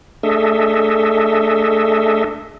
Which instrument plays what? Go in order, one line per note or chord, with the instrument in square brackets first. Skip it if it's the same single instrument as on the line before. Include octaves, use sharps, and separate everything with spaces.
[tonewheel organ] A3 D4 G#4 A4 D#5 E5